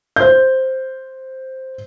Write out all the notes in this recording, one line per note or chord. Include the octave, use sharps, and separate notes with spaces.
C5 G6